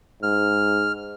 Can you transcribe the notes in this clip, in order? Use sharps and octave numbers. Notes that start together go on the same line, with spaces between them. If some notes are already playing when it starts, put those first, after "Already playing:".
G#2 F6